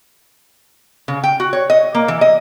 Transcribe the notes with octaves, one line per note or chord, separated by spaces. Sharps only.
C#3
G5
F#4
C#5
D#5
A#3
E3
D#5